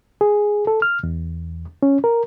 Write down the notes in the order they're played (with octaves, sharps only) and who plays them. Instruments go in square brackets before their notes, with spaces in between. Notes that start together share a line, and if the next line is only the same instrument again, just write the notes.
[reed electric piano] G#4
A4
F6
E2
C#4
A#4